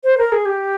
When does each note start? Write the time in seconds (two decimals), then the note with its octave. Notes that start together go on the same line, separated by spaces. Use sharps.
0.04 C5
0.18 A#4
0.32 G#4
0.45 G4